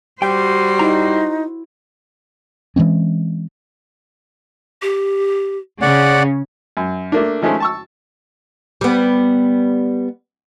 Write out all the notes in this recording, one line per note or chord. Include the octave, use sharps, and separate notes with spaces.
G3 F#4 C5 G5
D#4 E4 A#5
E3 G#3 C4 C#4
G4
C#3 C#4 G#4 D5 F#5
F#2
A3 A#3 D4
D#3 F3 G#3 A3 C#4
A5 C#6 E6
G3 B3